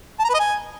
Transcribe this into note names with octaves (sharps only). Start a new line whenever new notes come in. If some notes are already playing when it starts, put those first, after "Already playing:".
A5
A#5
B4
D#5
G#5